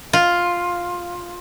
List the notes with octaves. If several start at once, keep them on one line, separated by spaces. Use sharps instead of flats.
F4